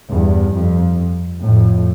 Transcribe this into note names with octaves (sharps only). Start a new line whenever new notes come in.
E2 G2
F2
F2 A2